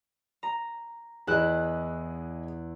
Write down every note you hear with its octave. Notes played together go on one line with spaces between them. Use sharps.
A#5
E2 E4 G#4 D#5 F#6